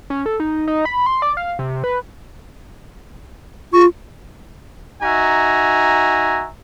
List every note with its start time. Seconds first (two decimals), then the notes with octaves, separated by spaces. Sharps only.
0.10 C#4
0.26 A4
0.40 D#4
0.67 D#4
0.85 B5
1.06 C6
1.22 D5
1.37 F5
1.59 C3
1.84 B4
3.73 F4 C#6
5.02 D#4 F#4 E5 G#5 A#5